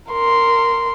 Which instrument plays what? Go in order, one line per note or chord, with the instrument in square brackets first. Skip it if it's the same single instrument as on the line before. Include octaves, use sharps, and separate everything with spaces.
[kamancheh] A#4 C6